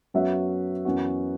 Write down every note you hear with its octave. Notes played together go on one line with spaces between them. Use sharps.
F#2 F#3 B3 F#4 E5
F#2 E3 B3 F#4